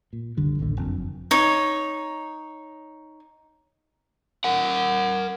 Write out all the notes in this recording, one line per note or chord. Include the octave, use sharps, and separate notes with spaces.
A#2
F#1 C2 D3 G3
A1 D#2 B2 D3
F#1 F2
D#4 C#5
A#4 F#5